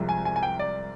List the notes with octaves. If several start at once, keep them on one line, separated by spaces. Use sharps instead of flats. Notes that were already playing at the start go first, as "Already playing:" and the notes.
Already playing: C2 C3 F3 G#3 C4
G#5
G#5
G#5
G5
D5